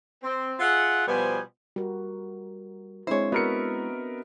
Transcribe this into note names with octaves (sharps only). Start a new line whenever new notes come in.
C4
F4 G#4 E5 F#5
B2 F3 G3 B3 C5 G#5
G3 F#4 A#4
G#3 C4 D4 E4 C5 C#5
B3 F#4 A#4 D#5 E5 C#7